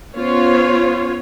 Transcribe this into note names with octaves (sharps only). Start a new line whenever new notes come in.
B3 C#4 F4 C5 C#5